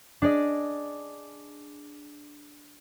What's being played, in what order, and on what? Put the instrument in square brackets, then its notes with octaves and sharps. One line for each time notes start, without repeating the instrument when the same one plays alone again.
[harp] D4 G#4 D5 D#5